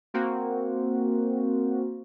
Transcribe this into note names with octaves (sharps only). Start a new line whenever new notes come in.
A#3 C4 F#4